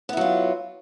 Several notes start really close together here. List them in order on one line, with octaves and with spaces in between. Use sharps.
B3 E4 F#3 F4